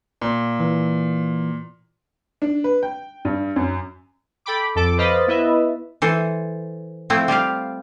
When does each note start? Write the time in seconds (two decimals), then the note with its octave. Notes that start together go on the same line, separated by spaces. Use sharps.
0.21 A#2
0.60 E3
2.42 D4
2.64 B4
2.83 G5
3.25 G2
3.56 F#2
4.46 A4 G5 B5 D6
4.75 F2 A4 D6
4.97 B4 C5 D#5 F5 B5 A6
5.27 B3 E4 B4 D#5 E5
6.02 E3 A4 C5
7.10 F3 A3 C4 E4
7.28 G3 F4 G4 F5